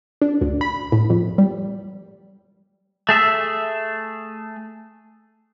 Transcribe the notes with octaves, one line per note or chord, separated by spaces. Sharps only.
D4
D2
B5
A2
F2
G3
A3 G#4 E5